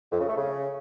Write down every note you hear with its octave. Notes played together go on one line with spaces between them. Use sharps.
F2
C#3
A3
C#3